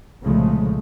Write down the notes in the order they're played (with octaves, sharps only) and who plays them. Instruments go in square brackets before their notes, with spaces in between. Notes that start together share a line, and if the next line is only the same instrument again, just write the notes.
[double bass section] C2 A#2 C#3 F3 G#3 A3